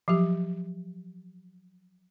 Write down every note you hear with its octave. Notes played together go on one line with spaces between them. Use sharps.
F3 F#3 G4